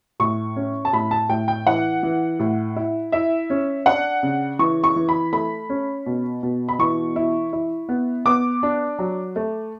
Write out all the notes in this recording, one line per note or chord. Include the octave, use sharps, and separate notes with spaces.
A2 C#6
C#4
A5
A2 B5
A5
A2 G5
G5
E3 F#5
E3
A2
E4
E4 E5
C#4
D4 F#5
C#3
E3 C#6
C#6
E3
B5
A3 B5
C#4
B2
B2
B5
E3 C#6
E4
E4
B3
B3 D6
D4
F#3
A3